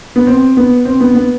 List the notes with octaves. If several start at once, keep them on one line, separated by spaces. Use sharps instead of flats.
B3
C4
B3
C4
B3
B3